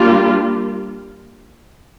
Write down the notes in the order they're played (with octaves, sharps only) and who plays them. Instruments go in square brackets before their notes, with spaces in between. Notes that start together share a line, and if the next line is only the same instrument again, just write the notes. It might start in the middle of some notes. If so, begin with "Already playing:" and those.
Already playing: [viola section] G3 A#3 D4 F4